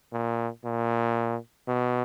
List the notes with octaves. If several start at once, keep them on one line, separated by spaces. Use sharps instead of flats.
A#2
A#2
B2